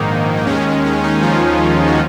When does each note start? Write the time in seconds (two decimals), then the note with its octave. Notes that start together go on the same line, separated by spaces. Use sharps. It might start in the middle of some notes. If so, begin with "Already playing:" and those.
Already playing: A#1 G#2 D#3 A#3 D#4
0.37 D#4
0.47 D#2 D#3 G#3 C#4
0.85 C#4
1.04 D#4
1.22 F3 F4
1.87 F#4